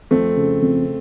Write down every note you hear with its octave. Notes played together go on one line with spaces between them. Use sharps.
F2 A3 C4
C#3
F2